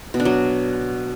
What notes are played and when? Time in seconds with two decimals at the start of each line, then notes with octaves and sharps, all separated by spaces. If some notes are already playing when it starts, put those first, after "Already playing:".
0.14 B2
0.20 D4
0.25 F#3